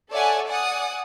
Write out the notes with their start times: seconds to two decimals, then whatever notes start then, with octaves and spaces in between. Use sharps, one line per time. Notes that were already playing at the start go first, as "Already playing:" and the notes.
0.11 A4 C#5 D5 E5 F#5 G#5
0.48 D5 F#5 G#5 D#6